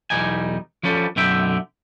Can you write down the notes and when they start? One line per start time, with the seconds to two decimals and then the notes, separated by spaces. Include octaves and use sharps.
0.10 B1 E2 G3 D#4 G#5
0.83 F3 G3 C#4 A4
1.16 B1 F#2 D3 E5 G5